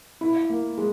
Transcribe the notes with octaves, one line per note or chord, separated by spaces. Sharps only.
E4
A#3
G#3